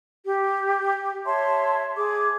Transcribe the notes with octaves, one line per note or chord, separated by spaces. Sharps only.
G4
C#5 E5 A5 C6
G#4 D6